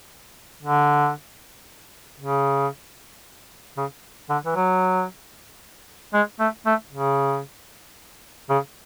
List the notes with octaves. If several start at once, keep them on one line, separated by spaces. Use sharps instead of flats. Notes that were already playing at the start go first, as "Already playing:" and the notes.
D3
C#3
C#3
D3
E3
F#3
G#3
A3
A3
C#3
C#3